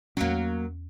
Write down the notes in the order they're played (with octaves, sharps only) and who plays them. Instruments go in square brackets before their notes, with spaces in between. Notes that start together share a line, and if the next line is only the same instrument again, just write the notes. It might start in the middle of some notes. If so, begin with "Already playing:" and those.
[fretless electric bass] E2 C#4 [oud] F#3 A#3